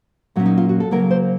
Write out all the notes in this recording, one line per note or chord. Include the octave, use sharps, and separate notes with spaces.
A#2 F#3 A#3 C#4
D#4
F4
F#4
A4
C#3 F#3 A#3 A#4
C5